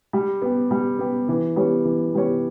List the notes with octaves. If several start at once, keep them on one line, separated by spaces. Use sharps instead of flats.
G3
B3 G4
G3
B3 G4
E3
G3 B3 G4 C#5
E3
G3 B3 G4 C#5